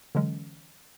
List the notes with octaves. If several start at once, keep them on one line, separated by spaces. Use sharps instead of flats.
D3 E3 F#3 G#3 C#4